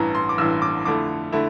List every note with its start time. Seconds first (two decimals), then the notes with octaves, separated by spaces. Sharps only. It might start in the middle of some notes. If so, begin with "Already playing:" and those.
Already playing: A1 G2 E3 A#5
0.15 C6
0.29 D6
0.38 A1 G2 E3 E6
0.62 D6
0.85 F2 D3 A3 E4 D6
1.32 D3 A3 E4